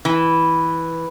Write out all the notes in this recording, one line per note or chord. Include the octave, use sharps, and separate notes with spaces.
E3